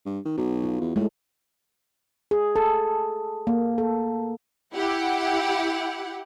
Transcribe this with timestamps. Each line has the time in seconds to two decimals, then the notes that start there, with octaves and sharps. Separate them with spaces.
0.06 G2
0.25 D#3
0.38 B1 F#4
0.63 F4
0.80 E2
0.96 A2 G#3 A3 A4
2.31 G#4
2.56 A4
3.47 A#3
3.78 A4
4.74 E4 G4 F#5